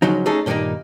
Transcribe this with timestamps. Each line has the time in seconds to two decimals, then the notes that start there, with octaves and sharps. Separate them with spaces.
0.02 C#3 F3 F#3 D#4
0.26 A3 C#4 D#4 G#4 A4
0.46 G2 A#2 D#3 G#3 A#3 D#4